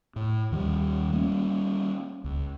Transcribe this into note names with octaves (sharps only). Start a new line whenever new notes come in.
A2
D#2 D#3 E3 G3
G3 A#3 C#4
C#2